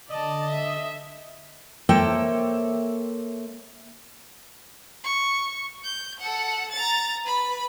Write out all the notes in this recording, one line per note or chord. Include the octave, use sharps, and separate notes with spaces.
D3 D5 D#5 A5
E5
A#3 A4 C5 C#5 E5 G5
C#6
G6
A4 F#5
A#5 A6
B4 B5